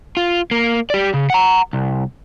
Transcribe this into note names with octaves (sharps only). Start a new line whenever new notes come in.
F4
A#3
G4 D5
C#3
F#5 A#5
C2